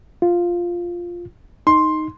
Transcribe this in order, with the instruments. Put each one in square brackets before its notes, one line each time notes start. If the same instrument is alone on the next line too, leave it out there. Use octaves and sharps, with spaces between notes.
[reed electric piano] F4
[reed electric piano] D#4 [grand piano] C6